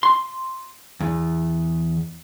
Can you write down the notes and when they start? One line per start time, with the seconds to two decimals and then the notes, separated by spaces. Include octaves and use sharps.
0.03 C6
1.00 E2